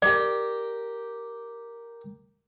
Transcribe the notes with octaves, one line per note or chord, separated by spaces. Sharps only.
G4 A#4 D5 G5